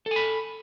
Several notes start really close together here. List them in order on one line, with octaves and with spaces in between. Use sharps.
A4 G#5 B5